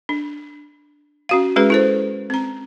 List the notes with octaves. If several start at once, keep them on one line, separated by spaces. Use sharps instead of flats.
D4
C#4 F#4 F5
G#3 C#4 F#4 G#4 B4
E4 A4 C5
C4 A#5